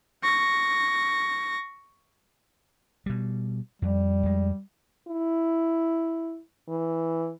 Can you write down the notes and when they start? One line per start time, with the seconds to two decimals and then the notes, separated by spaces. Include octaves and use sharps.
0.23 C#6 A#6
3.06 B2 G3
3.82 F2 G3
4.23 F2 G#3
5.08 E4
6.69 E3